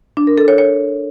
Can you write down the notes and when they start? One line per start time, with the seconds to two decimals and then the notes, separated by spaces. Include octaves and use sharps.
0.17 D4
0.27 A#4
0.38 A4
0.48 C#5
0.58 C#5